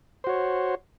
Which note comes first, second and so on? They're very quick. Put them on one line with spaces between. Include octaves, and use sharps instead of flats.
C5 F#4 C#5